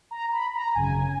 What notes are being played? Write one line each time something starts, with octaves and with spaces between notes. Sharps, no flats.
A#5
B5
A#5
G#1 F#2 C#3 G#5